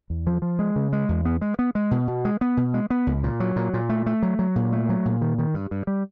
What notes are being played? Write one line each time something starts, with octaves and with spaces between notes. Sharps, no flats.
E2
F3
F3
G#3
C#3
G#3
E2
B3
G#3
B3
G#3
B2
B2
G#3
B3
B2
G#3
B3
C#2
A#2
F#3
A#2
A#2
A3
A3
F#3
F#3
A#2
A3
F#3
A#2
D#3
D#3
G2
G2
G3